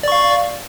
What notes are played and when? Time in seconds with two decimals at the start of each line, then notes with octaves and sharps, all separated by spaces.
0.03 D5
0.08 C#6
0.12 F5